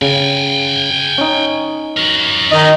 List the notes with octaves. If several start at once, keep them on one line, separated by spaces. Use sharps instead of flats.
C#3 G5 G#5
C#4 D#4
F#4 A#4
D#3 D#5